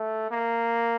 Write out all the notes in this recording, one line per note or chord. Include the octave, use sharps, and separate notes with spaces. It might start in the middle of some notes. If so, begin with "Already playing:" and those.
Already playing: A3
A#3